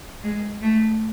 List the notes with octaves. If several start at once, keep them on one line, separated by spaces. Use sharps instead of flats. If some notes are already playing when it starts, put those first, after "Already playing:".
G#3
A3